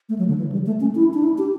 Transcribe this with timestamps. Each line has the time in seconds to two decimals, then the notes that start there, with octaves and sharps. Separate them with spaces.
0.09 A3
0.19 F#3
0.28 D3
0.38 E3
0.52 G3
0.66 A3
0.81 C#4
0.95 E4
1.14 D4
1.23 E4
1.38 G4